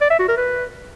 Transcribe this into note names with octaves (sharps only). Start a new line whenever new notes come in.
D5
E5
F#4
A#4
B4